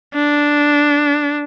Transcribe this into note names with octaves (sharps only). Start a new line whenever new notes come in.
D4